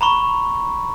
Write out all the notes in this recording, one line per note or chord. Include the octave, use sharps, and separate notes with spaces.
A#5 B5 C#6